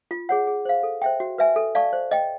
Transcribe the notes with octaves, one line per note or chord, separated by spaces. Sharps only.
F4
G#4 C#5 F#5
G#4
C5 F5
A4
C5 E5 G5
F#4
B4 E5 G#5
A4
D5 F5 A5 C#6
C5
D#5 G5